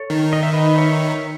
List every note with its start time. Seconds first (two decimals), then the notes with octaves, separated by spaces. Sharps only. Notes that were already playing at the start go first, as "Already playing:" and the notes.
Already playing: A4 C#5
0.10 D#3
0.33 D#5
0.43 E5
0.53 B4 D#5
0.78 C#5 E5